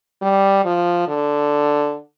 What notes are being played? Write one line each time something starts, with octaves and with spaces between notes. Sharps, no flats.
G3
F3
D3